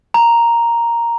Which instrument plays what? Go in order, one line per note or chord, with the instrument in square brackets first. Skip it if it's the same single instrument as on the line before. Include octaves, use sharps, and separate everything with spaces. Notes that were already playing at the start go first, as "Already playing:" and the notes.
[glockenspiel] A#5